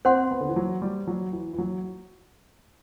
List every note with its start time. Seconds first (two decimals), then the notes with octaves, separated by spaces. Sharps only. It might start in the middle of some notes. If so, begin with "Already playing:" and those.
0.05 C4 C5 F#5 C6
0.31 B3
0.41 D3
0.49 E3
0.56 F#3
0.82 G3
1.07 F#3
1.32 E3
1.53 E3
1.58 F#3